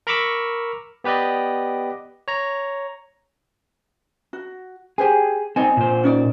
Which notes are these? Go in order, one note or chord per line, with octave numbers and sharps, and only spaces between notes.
A#4 A#5 B5 C#6 D6 E6
B3 G4 B4 D5 D#5
C#5 A#5
F#4
G4 G#4 C5 G#5
C4 D#4 D5 D#5 G#5
A#2 C5
C#4 D#4 D5